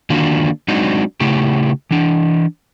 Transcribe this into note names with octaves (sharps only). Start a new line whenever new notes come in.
D3 D#3 A#3 D4 F4 F#4
F#3 G#3 C4 D4 D#4 F#4
C#3 A3 E4 G4
E3 D4